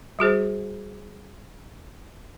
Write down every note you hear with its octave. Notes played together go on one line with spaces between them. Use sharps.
G3 F#4 G#4 C5